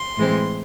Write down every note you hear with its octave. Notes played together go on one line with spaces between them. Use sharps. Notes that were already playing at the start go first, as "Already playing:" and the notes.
Already playing: C6
A2 E3 G#3 C4